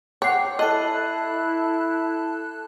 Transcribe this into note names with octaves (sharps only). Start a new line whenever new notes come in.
C#5 F#5 G5 D6 C7
E4 A4 D#5 A5 F#6